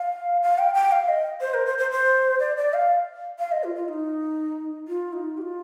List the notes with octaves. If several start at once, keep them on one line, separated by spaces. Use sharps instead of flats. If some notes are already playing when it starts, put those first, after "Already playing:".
Already playing: F5
F5
G5
G5
F5
D#5
C5
A#4
C5
C5
C5
D5
D5
F5
F5
D#5
F4
F4
D#4
F4
D#4
G4
F4